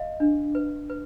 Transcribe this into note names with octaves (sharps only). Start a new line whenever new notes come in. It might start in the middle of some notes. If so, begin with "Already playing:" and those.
Already playing: D#5 F5
D4
B4
B4